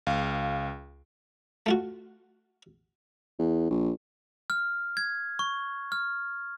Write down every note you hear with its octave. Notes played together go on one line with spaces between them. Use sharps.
C#2 F5
A3 F4 F#4
E2
A#1
F6
G#6
C#6
F6